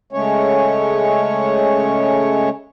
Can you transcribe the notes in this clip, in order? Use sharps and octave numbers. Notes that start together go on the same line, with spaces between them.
C#3 G#3 A3 C#4 C#5